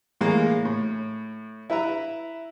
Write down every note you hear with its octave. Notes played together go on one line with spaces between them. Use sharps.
A2 E3 G#3 A#3
A2
E4 B4 E5 A#5